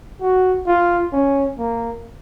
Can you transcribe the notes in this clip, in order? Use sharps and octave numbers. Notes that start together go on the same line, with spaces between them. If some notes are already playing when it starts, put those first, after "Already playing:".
F#4
F4
C#4
A#3